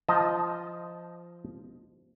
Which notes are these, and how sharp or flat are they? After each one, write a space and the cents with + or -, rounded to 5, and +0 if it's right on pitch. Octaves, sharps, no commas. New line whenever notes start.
F3 -15 D#5 +0 A5 +0